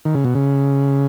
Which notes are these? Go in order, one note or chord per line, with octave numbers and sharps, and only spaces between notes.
D#3
C#3
B2
C#3